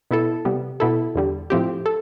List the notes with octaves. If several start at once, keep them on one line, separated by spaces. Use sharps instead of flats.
B2 B3 E4 A4
C3 G3 B3
B2 B3 E4 A4
E2 D3 G3
A2 F3 C4 G4
A4